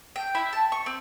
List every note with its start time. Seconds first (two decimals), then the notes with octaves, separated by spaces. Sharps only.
0.16 G5
0.35 E4
0.53 A5
0.72 C#6
0.86 C4